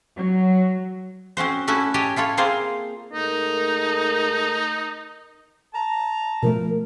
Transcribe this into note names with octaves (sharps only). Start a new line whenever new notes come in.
F#3
C4 C#4 F#4 C5
A3 C#4 E4 F#4 E5
G4 C#5 D#5 G#5 A5
E4 F4 A4 C#5
A#3 C4 F4 G#4 C5 F5
G#2 A3 D#4 A#4
A5 A#5
B2 F3 A3 A#4